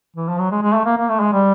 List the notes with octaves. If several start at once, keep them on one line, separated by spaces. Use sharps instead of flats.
E3
F3
F#3
G#3
G#3
A3
A#3
A#3
A3
G#3
G3